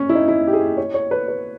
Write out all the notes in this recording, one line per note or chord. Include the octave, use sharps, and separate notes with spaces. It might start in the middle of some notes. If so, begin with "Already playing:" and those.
Already playing: C#4
E4
D#4
E4
G4
G#4
C#5
C#5
B4
B4